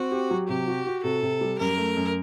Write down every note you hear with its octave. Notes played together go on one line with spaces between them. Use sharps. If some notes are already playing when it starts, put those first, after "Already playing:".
Already playing: C4 F#4
G4
F#3
C3 G4
F#4
F#4
C3 A4
C3
G3
F#2 A#4
A3
F#2